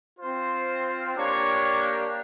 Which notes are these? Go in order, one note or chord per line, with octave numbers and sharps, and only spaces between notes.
C4 F4 C5
A#3 D4 G4 C#5